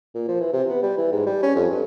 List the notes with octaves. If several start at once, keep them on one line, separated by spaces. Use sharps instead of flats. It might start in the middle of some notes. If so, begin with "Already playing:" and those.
A#2
F3
E3
C3
B3
G3
E3
G#2
G3
C#4
F2
G2